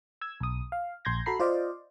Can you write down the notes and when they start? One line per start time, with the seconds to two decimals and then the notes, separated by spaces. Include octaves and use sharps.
0.21 E6 G#6
0.40 B1 D#6
0.72 F5
1.05 A#1 C6 G6 G#6 A#6
1.26 F#4 A4 A#5 B5 C7
1.40 F4 C5 D5 D#5 F5